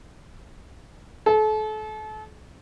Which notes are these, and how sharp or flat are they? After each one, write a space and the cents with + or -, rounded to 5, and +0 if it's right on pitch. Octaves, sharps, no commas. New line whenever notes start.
A4 -35